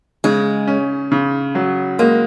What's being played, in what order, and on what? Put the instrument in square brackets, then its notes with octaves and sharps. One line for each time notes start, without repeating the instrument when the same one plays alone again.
[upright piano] C#3 [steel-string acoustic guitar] G#3
[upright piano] C#4
C#3
F#3
[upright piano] G#3 [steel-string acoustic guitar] A#3